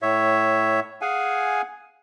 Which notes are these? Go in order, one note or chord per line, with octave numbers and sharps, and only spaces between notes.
A2 C#5 E5
G#4 F5 F#5 G#5